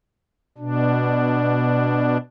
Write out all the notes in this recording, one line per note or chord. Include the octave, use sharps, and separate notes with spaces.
B2 D4